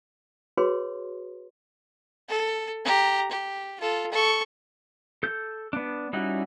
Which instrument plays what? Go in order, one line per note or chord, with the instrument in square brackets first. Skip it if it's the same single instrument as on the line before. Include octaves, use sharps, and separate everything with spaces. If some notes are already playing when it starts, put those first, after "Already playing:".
[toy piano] F#4 G#4 B4 C#5 C6
[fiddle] A4
G4 A#5
G4
F4 A4
A4 C#6
[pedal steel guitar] A4 G6
B3 D4
G3 C#4 D#4 E4 F#4